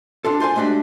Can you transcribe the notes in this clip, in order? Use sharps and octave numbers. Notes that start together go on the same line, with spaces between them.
D4 F4 A4
F4 C5 D5 G#5
G#3 A3 D4 F#4 G4